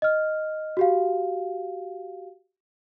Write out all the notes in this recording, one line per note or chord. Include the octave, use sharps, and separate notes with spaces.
D#5 F6
F#4 G4 F5